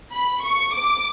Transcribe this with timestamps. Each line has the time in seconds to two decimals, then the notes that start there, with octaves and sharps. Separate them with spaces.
0.13 B5
0.43 C#6
0.76 D6